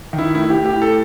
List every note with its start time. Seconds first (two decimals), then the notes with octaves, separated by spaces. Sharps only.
0.13 D#3
0.18 E4
0.34 A2 E4
0.50 A2 G4
0.66 G4
0.76 A2
0.82 A4